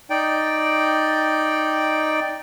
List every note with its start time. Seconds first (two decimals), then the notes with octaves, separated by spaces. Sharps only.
0.10 D#4 D5 G5